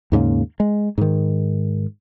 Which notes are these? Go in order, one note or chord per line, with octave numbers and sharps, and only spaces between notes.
D#2 G#2 C#3 A#3
G#3
G#2 D#3